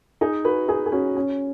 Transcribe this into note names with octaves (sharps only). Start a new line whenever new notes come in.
D#4 G#4
F#4 B4
D#4 G#4
G#4
C#4 F#4
C#4